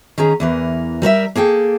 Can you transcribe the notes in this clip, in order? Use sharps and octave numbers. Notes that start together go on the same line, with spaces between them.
D#3 C#4 G#4 A#5
E2 E3 A#4
G3 A#4 C#5 E5
A#3 G#4 A4 G5